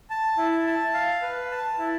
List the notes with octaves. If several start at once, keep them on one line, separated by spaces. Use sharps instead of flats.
A5
E4
A5
F5
B4
A5
E4